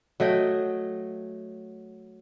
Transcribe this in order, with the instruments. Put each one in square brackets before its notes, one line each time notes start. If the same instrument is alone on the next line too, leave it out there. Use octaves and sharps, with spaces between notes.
[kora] F#3 A3 D#5 G5